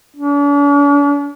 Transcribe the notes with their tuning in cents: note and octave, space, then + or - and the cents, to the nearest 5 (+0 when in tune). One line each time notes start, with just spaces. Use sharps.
D4 -45